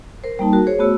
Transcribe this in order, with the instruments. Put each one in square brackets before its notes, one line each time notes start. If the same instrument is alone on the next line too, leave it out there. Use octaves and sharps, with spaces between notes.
[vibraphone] A#4 C5
G3 A#3 D#4 A5
F#4 A#4
G#4 C5 C#5
A3 B3 F#4 E6